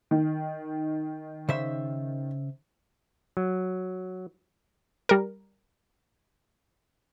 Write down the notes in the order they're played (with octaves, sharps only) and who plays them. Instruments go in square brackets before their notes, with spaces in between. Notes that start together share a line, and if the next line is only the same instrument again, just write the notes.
[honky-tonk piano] D#3
[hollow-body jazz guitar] C#3 C5 E5
[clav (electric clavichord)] F#3
[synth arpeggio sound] G3 A#4